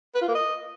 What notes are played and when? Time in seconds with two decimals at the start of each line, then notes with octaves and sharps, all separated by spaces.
0.15 B4
0.22 F4
0.28 A#3
0.35 D#5